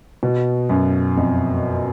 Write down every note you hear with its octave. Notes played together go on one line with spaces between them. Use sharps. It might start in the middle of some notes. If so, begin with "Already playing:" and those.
B2
F#2
F2